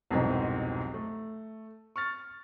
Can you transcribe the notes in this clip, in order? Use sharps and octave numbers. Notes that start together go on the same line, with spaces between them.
C2 F2 G#2 B2 F#3 C4
A3
C#6 F6 A6